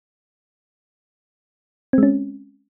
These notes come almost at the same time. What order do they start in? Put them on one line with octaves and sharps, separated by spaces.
C4 G#3 C#4